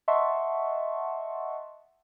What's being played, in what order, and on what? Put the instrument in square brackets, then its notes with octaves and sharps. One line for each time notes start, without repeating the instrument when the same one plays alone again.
[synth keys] D#5 E5 F#5 A5 C6 C#6